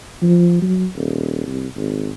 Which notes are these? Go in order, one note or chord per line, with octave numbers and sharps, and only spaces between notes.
F3
F#3
D#1
C2
G#1